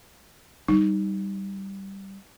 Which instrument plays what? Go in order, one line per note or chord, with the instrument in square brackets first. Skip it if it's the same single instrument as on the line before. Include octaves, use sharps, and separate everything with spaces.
[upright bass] G3 [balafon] D#4